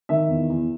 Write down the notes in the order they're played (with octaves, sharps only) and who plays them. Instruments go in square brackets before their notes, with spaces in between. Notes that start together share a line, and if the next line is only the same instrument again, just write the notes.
[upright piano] D#3 E5
E2
E2